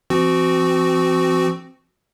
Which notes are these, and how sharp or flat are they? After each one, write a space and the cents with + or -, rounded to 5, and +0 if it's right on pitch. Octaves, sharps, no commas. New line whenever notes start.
F3 -45 C4 +0 F#4 +0